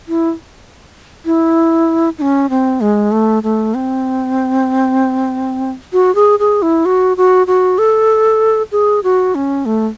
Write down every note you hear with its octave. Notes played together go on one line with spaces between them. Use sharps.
E4
E4
D#4
C#4
C4
G#3
A3
A3
C4
F#4
G#4
G#4
E4
F#4
F#4
F#4
A4
G#4
F#4
C#4
A3